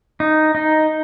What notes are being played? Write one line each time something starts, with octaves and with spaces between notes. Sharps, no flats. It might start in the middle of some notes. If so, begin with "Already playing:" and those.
D#4
D#4